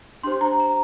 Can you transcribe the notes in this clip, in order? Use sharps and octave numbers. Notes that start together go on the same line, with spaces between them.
D4 G4 C5 C6
A#5
A#5